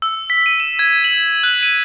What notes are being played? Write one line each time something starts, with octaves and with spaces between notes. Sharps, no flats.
E6
B6
D#7
E7
G#6
F#7
F#6
D#7